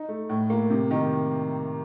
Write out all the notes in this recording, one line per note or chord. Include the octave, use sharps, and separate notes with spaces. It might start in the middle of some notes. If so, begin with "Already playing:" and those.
Already playing: D#4
A3
A2
A#3
C3
D#3